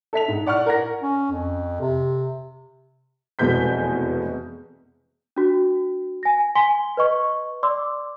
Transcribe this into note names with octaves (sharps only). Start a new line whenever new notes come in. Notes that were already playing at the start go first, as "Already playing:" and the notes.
A4 E5 B6 F7
G#2
D5 F#5 C#6 F6
A#4 F#5 A#6
C#4
F2
C3
F1 E2 B2 G#3 G6 B6
D4 F#4
G#5 A#6
G#5 C6 B6 G7
B4 D#5 C#6
D5 C6 D6 E6